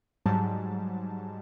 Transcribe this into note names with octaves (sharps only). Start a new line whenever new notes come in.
G#2 F#3 G3 A5